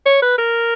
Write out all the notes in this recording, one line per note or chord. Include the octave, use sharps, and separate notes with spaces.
C#5
B4
A#4